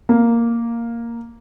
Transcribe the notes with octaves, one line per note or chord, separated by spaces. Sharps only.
A#3